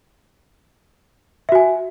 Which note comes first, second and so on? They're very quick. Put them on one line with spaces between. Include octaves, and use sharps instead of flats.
E5 F#4 G#5